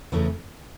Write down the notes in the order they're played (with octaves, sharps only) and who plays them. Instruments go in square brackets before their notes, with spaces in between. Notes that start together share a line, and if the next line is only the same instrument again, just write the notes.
[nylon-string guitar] E2 C#3 E3 A3 C#4